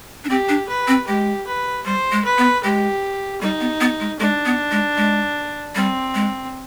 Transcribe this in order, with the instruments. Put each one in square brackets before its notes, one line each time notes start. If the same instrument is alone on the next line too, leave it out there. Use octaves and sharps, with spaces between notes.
[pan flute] D4
[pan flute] C4 [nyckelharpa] G4
[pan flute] D4
[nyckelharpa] B4
[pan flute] C4
[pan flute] G#3 [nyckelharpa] G4
[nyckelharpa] B4
[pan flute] G3 [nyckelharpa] C5
[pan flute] G#3
[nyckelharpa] B4
[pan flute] B3
[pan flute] G#3 [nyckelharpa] G4
[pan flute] G3 [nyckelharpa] D#4
[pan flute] B3
B3
G#3
[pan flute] G#3 [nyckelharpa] D4
[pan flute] B3
G#3
G#3
[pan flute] G3 [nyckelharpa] C4
[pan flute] G#3